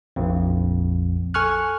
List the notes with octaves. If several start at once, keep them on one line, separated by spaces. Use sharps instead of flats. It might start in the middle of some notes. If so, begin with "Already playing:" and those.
A#1 F2
A4 G#5 C#6 F6 F#6